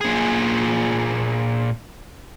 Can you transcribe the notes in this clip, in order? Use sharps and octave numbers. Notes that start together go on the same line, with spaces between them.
A#2 G#4